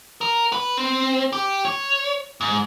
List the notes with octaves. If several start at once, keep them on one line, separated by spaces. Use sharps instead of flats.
A#4
B4
C4
G4
C#5
G#2